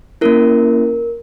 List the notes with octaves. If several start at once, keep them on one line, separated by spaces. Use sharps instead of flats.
A#3 C#4 E4 A#4